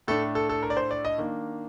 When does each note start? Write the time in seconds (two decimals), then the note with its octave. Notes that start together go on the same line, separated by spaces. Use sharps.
0.08 A2 A3 D4 A4
0.35 A4
0.49 A4
0.63 A#4
0.70 D5
0.77 C5
0.91 D5
1.05 D#5
1.18 D#3 A#3 D4